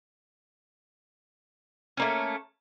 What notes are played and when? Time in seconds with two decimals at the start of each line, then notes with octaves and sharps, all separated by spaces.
1.97 A3 A#3 C#4